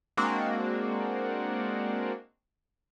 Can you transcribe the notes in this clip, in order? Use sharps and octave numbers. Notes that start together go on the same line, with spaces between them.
G#3 A#3 C4 D4 F#4